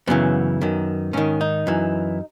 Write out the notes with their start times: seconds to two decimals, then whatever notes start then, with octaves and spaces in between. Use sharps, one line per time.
0.07 F#2 C#3 E3 B3
0.61 F#2 D#3
1.13 G#2 D#3 C#4
1.41 D#4
1.67 F#2 E3